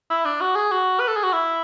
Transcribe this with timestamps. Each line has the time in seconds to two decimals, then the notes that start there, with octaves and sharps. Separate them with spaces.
0.10 E4
0.26 D4
0.41 F#4
0.56 G#4
0.72 F#4
1.00 B4
1.08 A4
1.16 G#4
1.24 F#4
1.33 E4